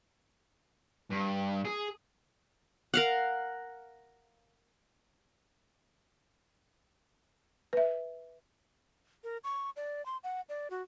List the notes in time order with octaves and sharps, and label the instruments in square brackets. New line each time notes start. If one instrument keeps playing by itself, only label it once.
[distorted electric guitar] G2
G#4
[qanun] A#4 F5 F#5
[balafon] B4 E5
[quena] A#4
C#6
D5
C6
F#5
D5
F#4